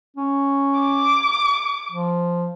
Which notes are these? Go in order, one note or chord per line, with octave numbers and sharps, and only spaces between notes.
C#4
D6
F3